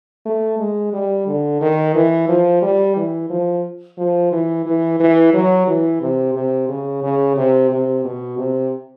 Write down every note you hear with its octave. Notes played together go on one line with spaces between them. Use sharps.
A3
G#3
G3
D3
D#3
E3
F3
G3
E3
F3
F3
E3
E3
E3
F#3
E3
C3
C3
C#3
C#3
C3
C3
B2
C3